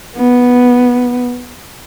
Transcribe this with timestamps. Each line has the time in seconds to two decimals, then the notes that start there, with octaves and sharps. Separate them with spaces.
0.16 B3